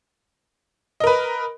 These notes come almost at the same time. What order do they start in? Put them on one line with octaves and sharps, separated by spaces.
D#5 A#4 B4